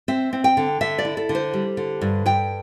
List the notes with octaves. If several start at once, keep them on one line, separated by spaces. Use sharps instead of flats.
C4 E5
C4
G5
D3
D3 E5
D5
E4
A4
D3
C5
G3
D3
G2
G2 G5